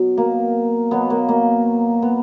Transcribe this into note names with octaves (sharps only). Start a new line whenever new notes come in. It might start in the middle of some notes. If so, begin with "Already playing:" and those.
Already playing: B2 F#3
A#3
B2 F#3 B3
A#3
A#3
B3